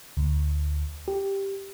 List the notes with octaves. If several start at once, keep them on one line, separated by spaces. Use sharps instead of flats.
D2
G4